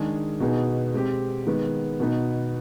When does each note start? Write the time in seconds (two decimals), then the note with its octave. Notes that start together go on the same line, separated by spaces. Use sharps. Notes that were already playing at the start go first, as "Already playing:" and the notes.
Already playing: D#3 G#3 D4 G#4
0.40 B2 B3 D#4 G#4
0.94 G#3 C4 G4
1.47 D#3 G#3 B3
2.00 B2 B3 D#4